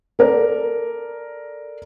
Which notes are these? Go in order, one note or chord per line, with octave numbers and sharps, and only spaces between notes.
A4 A#4 D5